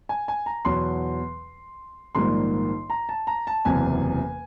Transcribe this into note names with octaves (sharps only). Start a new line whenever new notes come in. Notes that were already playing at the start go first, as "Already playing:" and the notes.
G#5
G#5
A#5
E2 B2 F#3 C6
A#1 G#2 D#3 G3 A#3 C6
A#5
A5
A#5
A5
F#1 E2 C3 G#5